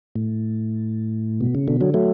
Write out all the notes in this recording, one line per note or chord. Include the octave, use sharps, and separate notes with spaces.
A2
B2
C#3
B2 D3
D3 F#3
F#3 A3